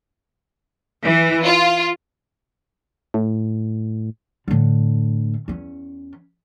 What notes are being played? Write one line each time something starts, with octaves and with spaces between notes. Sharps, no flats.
E3
F4
A2
A2 D3
E2 C#4